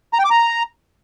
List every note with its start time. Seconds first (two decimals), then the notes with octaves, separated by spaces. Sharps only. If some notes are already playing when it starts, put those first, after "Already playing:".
0.13 A#5
0.19 G5
0.25 D6
0.31 A#5